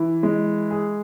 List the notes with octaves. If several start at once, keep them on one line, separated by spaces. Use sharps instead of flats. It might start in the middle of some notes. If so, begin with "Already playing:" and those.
Already playing: E3
G#3
G#4